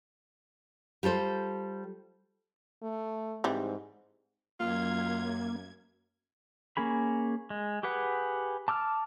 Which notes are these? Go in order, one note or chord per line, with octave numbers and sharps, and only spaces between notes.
G3 F4 A4 C5
A3
G#2 E3 G3 C4
F#2 A#3 F4 G#6
A#3 C#4 G#4 B5
G#3
G4 G#4 B4 F#5
A5 D6 E6 F6